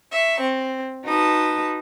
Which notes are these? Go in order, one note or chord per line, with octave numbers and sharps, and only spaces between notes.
E5 C#6
C4
D#4 F#4 B4 A5 D#6